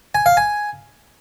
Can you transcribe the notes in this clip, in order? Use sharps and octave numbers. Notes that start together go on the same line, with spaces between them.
G#5
F5
G#5